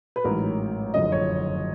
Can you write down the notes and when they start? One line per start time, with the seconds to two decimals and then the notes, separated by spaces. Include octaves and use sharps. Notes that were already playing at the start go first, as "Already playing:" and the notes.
0.16 B4
0.24 A1 G#2 D#3 F#3 A#4
0.94 F#1 F2 D3 D#5
1.12 C#5